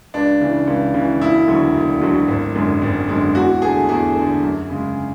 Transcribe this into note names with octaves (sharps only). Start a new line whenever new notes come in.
C#2 D4
C#3 E3
C#2
C#3 E3
E1 E4
D2 D3 F#3
E1
D2 D3 F#3
G#1
F#2 D3 G#3
G#1
F#2 D3 G#3
E2 F#4
D3 A3 G#4
E2 G#4
D3 A3
F#2
C#3 G#3